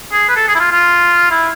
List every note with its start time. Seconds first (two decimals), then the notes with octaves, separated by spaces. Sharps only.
0.12 G#4
0.29 B4
0.36 A4
0.48 G#4
0.55 E4
0.60 F4
0.72 F4
1.31 E4